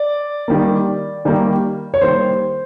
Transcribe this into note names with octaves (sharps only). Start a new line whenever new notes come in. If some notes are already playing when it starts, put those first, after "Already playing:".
Already playing: D5
D#3 G3 A#3
D#3 G3 A#3
C#5
D#3 G3 A#3 C5